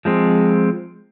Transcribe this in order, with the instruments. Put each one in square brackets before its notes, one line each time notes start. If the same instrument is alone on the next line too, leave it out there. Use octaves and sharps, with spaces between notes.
[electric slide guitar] F3 G#3 C4